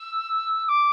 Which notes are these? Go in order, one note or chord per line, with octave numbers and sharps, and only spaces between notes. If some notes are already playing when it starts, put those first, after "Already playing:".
Already playing: E6
D6